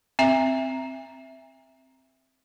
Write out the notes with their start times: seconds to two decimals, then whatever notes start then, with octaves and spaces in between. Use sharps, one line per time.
0.19 C4 E5 A#5